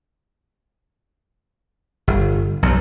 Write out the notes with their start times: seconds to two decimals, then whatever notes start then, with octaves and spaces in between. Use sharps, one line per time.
2.08 G1
2.63 B1 G2